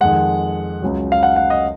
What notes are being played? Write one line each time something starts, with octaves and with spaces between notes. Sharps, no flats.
F2 D#3 G#3 F#5
C#2 C#3 F#3
F5
F#5
F#5
D#5